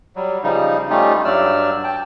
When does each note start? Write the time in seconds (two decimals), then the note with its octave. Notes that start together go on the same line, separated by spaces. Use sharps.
0.16 F#3 G3
0.43 C#3 F3 G3 D#4
0.90 G3 A3 C#4 D#4 F4 G4
1.25 G2 F#3 D5 E6 F6
1.84 G5 A5